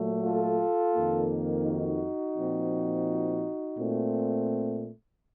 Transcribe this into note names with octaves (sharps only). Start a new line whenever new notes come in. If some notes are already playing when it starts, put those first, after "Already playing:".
Already playing: A#2 F#3 A3
F4 A4
F2 D#3 A#3
D#4 F#4
A#2 F3 C4
A#2 A3 C4